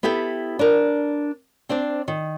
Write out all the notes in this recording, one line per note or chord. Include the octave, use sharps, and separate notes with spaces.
B3 E4 G4 A4 G5
D4 A#4
C4 D4 C5 D5
D#3